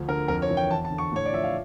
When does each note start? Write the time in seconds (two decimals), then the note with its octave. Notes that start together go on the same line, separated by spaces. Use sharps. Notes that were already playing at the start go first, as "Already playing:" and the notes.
Already playing: D2 F3
0.08 D3 A#4
0.28 F2 A#4
0.42 C#5
0.50 E3
0.57 G5
0.70 E2 A5
0.85 A5
0.90 D3
0.98 C#6
1.12 A2 C#5
1.25 D5
1.32 F3 E5
1.44 F5